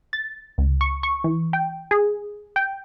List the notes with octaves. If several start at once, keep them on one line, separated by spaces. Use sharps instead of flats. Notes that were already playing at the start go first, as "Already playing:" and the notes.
A6
C#2
C#6
C#6
E3
G5
G#4
G5